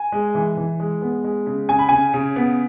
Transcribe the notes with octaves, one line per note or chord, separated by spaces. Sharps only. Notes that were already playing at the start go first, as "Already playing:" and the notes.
Already playing: G#5
G#3
E3
E3
G#3
B3
G#3
C#3
C#3 G#5
B5
C#3 G#5
C#3
B3